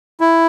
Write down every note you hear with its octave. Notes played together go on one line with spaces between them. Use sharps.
E4